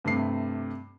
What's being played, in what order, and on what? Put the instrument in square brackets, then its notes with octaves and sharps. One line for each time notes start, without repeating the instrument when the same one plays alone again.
[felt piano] G2 C3 A3 C7